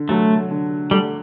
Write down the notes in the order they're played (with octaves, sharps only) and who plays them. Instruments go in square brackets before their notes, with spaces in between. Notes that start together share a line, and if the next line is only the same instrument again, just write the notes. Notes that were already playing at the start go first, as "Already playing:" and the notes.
Already playing: [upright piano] D3
[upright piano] F#3 [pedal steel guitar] A3
[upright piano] D3
[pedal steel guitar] G3 [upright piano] A3